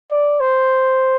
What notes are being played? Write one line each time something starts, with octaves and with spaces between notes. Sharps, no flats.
D5
C5